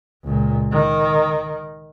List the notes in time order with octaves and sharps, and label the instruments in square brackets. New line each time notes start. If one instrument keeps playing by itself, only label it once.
[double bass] C#2 A#2
D#3